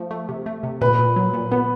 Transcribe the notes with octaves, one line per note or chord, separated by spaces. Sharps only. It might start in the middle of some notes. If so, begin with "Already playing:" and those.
Already playing: F3 A3
A3
C3
A3
C3
A#2 B4
A#2
F#3
A#2
B3 B4